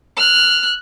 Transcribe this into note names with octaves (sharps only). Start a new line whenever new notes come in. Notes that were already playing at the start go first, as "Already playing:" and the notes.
F6 F#6